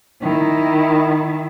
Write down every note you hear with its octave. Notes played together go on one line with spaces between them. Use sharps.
D#3 E4